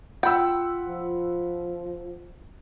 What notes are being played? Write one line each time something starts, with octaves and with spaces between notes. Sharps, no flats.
F4 F#5 G5 B5 E6
F3